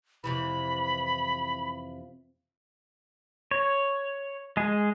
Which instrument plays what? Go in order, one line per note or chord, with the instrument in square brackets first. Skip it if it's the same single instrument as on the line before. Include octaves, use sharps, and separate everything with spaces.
[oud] F2 C3 E3 [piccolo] B5
[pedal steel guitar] C#5
G#3 G#4